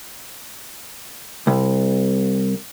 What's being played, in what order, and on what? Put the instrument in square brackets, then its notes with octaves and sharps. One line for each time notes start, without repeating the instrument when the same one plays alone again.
[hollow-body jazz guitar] C2